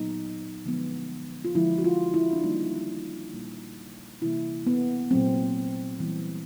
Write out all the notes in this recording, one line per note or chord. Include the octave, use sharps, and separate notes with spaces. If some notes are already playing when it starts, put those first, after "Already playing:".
Already playing: A#2 F#3 B3 D#4
D3 F3 G#3 B3
F4
D3 F3 G#3 E4
F#4
F4
E4
D4
D#3 G3 A#3 D#4
A#2 G3 A#3
C3 E3 G3 A#3 E4
B3
A#2 F#3 A3 C4
E3 G3 B3